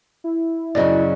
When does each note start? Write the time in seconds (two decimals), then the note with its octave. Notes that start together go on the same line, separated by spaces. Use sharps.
0.24 E4
0.75 F#2 C#3 F#3 D5 D#5